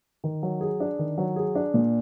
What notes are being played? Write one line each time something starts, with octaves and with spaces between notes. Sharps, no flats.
D#3
F#3
G#4
D4
D#3
F#3
G#4
D4
A#2